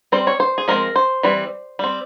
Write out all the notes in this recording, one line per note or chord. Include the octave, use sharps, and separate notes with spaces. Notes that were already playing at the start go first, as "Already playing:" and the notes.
G3 C4 C5
C#5
C5
G#4
F3 G#3 C4 A#4
C5
E3 G3 C4
G3 C4